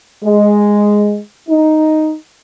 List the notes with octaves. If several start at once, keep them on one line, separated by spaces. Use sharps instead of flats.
G#3
D#4